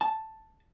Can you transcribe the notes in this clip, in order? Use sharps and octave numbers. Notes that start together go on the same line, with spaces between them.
A5